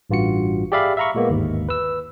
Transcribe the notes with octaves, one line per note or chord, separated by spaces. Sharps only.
A1 G2 F4 F#4 C#7
G4 G#4 D5 E5 F5 B5
E5 F5 A#5 B5 C#6
A#2 G#3 A#3 B3
G1 D#2 G#2
B4 E6